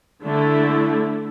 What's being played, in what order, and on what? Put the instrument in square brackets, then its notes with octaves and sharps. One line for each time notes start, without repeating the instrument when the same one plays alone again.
[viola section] D3 A3 E4